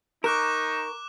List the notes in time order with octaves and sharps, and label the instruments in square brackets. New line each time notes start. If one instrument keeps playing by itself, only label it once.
[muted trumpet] D#4 [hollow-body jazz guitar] A#4 [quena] C#6 [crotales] D6 F#6 E7